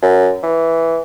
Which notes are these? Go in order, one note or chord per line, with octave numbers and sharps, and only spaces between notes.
F#2
E3